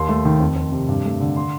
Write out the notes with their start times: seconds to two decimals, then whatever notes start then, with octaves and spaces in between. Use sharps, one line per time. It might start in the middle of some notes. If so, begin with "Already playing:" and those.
Already playing: D#2 C6
0.09 A3
0.25 D#3
0.40 F2
0.56 F2
0.72 C3
0.89 G2
1.05 A3
1.20 D3
1.37 C6